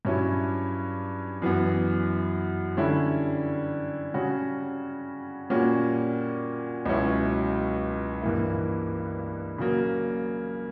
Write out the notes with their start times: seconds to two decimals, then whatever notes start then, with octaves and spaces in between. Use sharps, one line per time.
0.05 G2 F#3 C#4 E4
1.42 F#2 E3 B3
2.77 D3 G3 C#4 E4
4.14 C#3 G3 C#4 F#4
5.50 A#2 G3 A#3 C#4 F#4
6.86 C#2 B2 F#3 C#4 E4
8.22 G2 E3 A#3 E4
9.58 C#3 F#3 A#3